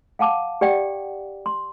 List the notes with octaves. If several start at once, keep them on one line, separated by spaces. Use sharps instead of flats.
F5 F#5 A5 D6
G4 D5 F#5 G5
C6